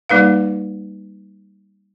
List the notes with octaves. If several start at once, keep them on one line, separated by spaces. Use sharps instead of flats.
G3 A#3 D#4 B4 F5